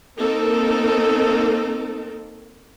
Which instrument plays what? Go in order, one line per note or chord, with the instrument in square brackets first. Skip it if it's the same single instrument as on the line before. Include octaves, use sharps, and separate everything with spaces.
[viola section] A#3 C4 D#4 A4 A#4